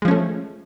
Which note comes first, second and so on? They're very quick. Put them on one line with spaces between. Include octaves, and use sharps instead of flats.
G#3 F3 C#4 A3